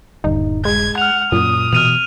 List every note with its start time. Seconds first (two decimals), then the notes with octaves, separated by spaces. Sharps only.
0.24 D#1 G2 D3 D#4
0.65 G#3 G#6
0.98 F#5 F6 F7
1.32 F#2 A#2 F#3 D#6
1.73 B2 E3 F6 D#7 F7